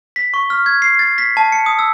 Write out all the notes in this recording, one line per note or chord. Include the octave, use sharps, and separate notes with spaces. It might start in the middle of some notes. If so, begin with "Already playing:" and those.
B6
C#6
F6
G#6
C7
A6
B6
A5
C#7
D#6
E6